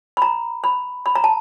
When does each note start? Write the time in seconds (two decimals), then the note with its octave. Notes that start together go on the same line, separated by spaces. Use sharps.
0.17 B5
0.22 A#5
0.64 B5
1.06 B5
1.15 A#5
1.24 A5